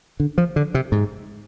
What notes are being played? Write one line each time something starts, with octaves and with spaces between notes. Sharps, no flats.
D3
F3
D3
C3
G#2